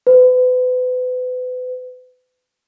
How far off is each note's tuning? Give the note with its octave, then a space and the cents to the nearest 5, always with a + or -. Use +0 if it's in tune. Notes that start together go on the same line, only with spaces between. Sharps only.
B4 +35